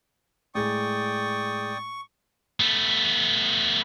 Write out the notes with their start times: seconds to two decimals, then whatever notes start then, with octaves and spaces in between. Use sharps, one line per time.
0.55 A2 G#3 D5 G5 C#6 D#6 A6
2.60 A3 B3